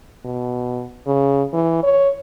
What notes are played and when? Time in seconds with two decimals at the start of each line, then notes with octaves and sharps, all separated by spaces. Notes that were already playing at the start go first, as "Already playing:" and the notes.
0.25 B2
1.07 C#3
1.53 E3
1.83 C#5